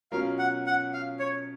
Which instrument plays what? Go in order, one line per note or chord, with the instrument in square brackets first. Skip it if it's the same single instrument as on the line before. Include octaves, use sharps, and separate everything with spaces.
[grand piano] B2 F#3 C#4 F4 A#4 [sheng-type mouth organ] F5
[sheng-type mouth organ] F#5
F#5
F5
C#5